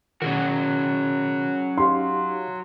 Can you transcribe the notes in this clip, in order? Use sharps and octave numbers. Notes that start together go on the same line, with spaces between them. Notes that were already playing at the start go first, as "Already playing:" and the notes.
B2 D#3 F#3 C#4 F#4 G#4 A#4
D#4 G4 F5 C6